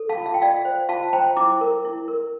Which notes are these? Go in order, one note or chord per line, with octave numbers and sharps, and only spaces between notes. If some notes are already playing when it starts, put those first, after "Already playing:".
Already playing: A4
F5 A5
F4
F5
G5
F4 D5 F5
C5
F4 F5 A5
C5 G5 A#5
E4 A#5 D6
A#4
E4
A#4